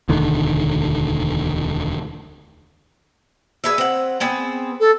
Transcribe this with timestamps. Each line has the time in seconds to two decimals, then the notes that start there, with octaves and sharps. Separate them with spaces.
0.08 E1 D2 D3 D#3
3.64 G#4 B4 E5
3.78 C4 F#5
4.20 B3 C4 G#4
4.80 A4